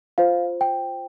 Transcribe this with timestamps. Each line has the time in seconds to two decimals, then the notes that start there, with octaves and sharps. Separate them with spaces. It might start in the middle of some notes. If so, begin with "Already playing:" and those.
0.18 F4 C5 F5
0.61 G5